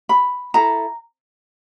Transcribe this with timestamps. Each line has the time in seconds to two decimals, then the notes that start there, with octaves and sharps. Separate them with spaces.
0.09 B5
0.54 E4 A4 A#5